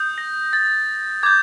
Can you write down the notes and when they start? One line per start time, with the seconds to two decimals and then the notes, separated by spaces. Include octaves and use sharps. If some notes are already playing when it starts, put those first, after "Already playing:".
Already playing: D#6 G6
0.18 A#6
0.53 A6
1.23 D6 G6 G#6